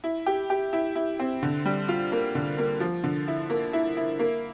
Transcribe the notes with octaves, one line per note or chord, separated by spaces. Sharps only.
E4
G4
G4
E4
E4
C4
D3
G3
F4
A#3
D3
A#3
F3
D3
E4
A#3
E4
E4
A#3